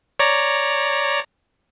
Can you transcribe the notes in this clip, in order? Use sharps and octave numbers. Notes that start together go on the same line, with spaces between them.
C#5 D5 A#5